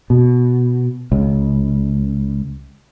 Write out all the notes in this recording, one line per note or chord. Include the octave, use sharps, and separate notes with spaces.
B2
C#2